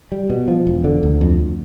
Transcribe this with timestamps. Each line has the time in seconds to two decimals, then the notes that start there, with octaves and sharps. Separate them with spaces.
0.12 G3
0.30 B2
0.48 F3
0.67 E1
0.84 D3
1.03 D2
1.21 F2